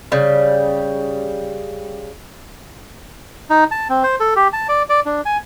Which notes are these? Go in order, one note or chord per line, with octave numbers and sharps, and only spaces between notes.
C#3 G3
D#4
A5
C4
C5
A4
G4
A5
D5
D5
D4
G#5